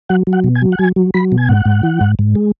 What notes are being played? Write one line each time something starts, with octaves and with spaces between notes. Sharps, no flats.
F#3 F#5
F#3
F#5
B2
G#5
F#3
F#5
F#3 G#5
F#3
F#3 B5
B2
G#5
G#2 F#5
G#2
E3
G#2
G#2
G#3